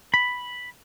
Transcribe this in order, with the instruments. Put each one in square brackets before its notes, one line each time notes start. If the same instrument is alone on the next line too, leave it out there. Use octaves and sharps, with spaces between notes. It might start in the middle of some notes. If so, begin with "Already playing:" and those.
[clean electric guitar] B5